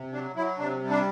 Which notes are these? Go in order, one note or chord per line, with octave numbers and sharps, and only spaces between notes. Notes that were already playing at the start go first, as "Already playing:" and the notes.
Already playing: C3
F#3 D4
F#3 E4
C3 D4
G3
D4